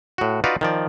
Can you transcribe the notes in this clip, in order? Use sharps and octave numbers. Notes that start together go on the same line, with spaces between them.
A2 F#4
D#4 F4 F#4 B4 D5 F5
D#3 F3 D5